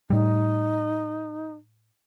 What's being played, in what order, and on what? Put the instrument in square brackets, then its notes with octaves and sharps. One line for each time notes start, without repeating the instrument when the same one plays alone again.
[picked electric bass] A2 G3 [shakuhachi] D#4